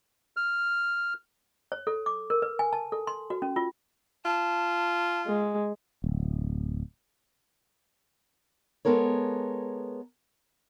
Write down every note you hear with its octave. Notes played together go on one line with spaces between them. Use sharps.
F6
C#5
A4
D6
A#4
B4
G#5
A5
A4
C6
F#4
C#4
F4
F4 A5
G#3
D1
G#3 B3 A4 A#4 C#5